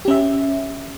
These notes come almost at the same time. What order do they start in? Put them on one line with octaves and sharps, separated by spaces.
G4 C#4 E5